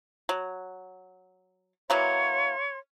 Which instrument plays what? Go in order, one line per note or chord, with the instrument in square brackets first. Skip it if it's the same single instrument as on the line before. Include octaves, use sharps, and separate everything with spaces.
[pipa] F#3
[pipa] E3 F#3 A#3 [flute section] C#5 C6